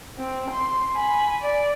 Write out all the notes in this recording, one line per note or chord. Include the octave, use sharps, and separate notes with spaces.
C4
C6
G#5 B5
D5